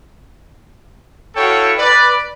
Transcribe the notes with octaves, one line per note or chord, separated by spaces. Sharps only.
E4 F#4 A4 C#5 F5 G5
B4 D5